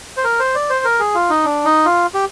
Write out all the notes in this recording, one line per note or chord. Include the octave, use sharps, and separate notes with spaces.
C5
A#4
C5
D5
C5
A#4
G#4
F4
D#4
D4
D#4
F4
G4